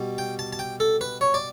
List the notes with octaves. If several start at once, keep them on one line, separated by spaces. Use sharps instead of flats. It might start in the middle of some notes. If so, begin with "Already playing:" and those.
Already playing: B2 G3
G5
A5
A5
G5
A4
B4
C#5
D5